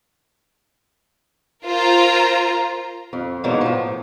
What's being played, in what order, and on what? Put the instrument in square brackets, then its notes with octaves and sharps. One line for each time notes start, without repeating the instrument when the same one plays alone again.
[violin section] F4 A#4 C5 A#5
[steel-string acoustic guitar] F2
G#2 B2 D3 E3 F#3 A#3
A2 F3